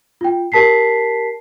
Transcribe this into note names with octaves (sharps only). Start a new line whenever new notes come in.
F4 G5
G4 A#4 A5 B6 C7